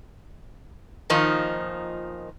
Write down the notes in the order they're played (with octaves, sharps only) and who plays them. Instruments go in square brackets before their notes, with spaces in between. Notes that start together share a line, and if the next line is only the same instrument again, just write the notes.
[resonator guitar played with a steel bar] A#2 D#3 F3 D#4